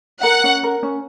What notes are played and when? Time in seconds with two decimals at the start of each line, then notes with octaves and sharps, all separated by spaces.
0.23 A#4 F#5
0.44 C#4
0.63 A#4
0.83 C#4